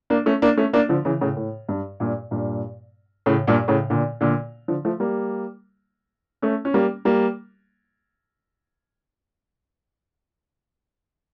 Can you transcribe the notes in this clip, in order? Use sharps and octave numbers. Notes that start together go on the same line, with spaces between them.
A#3 D4
A3 C#4
A#3 D4
A3 C#4
A#3 D4
D3 F3
C#3 E3
A2 C#3
A2
G2
G2 A#2
G2 A#2
A2 C#3
G2 A#2
A2 C#3
A#2 D3
A#2 D3
D3 F3
F3 A3
G3 A#3
A3 C#4
C#4
G3 A#3
G3 A#3